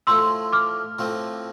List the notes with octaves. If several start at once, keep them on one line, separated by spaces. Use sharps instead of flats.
A2 F3 A3 C6 E6
D6 F6
A2 F3 A3 C4